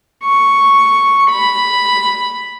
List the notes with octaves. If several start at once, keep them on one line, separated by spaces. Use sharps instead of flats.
C#6
B5